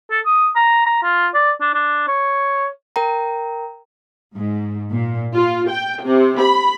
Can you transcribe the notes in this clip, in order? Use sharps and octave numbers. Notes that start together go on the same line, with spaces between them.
A4
D#6
A#5
A#5
F4
D5
D4
D4
C#5
A#4 G5 A#5
G#2
A#2
F4
G5
C3
B5